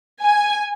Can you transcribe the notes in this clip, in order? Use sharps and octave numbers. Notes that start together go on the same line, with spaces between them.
G#5